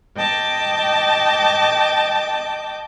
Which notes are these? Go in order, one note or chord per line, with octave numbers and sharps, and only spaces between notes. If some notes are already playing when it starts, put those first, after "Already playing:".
D#5 G5 A5 D6